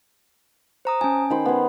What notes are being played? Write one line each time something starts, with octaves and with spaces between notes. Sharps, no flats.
C5 A#5 D#6
C#4 G#5 A5
D#3 C5 B5
B3 G#4